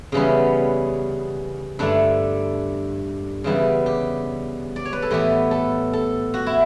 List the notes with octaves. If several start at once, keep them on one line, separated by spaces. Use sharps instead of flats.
C#3 E3 G3 B3 C#4
G2 D3 A3 D4
C#3 E3 G3 B3
G4
D5
C#5
B4
A4
A2 E3 B3 G4
A4
A4
F#4
E4